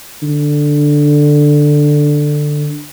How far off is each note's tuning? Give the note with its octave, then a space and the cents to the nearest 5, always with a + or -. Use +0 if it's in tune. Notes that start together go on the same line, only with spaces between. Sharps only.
D3 +5